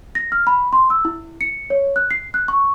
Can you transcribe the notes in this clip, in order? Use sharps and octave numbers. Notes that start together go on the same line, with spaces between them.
A#6
F6
B5
C6
E6
E4
C#7
C#5
F#6
C7
F#6
C#6